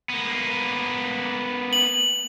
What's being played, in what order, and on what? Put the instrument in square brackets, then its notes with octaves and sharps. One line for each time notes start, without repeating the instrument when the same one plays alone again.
[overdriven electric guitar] A#3 B3
[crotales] F#7